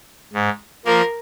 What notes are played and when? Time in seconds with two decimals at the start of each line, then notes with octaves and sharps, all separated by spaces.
0.33 G#2
0.85 F3 A#3 A#4